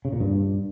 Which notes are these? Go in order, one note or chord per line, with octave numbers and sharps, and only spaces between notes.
C#3
A#2
G2